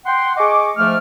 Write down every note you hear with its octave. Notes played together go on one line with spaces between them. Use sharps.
F#5 G5 C6
G#4 D#5 C#6 D6
G#2 F3 A3 F5 D6 F6